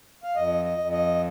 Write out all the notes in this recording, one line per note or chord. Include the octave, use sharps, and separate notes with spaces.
F5
F2 D#5
D#5
F2
D#5